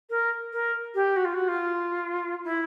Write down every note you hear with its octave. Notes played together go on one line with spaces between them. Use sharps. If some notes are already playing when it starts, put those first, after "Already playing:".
A#4
A#4
G4
F#4
F4
F#4
F4
E4